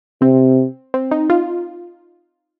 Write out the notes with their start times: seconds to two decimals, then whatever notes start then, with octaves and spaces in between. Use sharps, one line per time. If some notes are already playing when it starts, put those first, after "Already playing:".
0.21 C3 C4
0.94 C4
1.11 D#4
1.30 F4